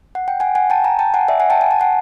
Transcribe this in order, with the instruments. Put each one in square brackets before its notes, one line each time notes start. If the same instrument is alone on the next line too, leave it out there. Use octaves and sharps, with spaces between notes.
[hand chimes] F#5
G5
F#5 G#5
F#5 G#5
G5 A5
G#5 A#5
G5 A5
F#5 G#5
D5 E5
F#5 G#5
G5 A5
G#5
A5
F#5 G#5